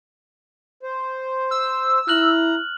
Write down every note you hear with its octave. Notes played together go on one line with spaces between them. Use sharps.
C5
E6
E4 A#5 F6 F#6 F#7